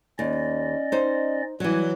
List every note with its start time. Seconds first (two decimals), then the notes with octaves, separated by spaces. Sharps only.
0.19 D#2 C#4 D5 D#5
0.92 D#4 C5
1.60 E3 F#3 G3